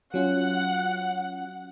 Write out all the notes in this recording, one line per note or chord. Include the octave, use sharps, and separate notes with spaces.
F#3 C#4 F4 F#5